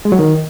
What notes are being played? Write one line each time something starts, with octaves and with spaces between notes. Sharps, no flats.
G#3
F#3
D#3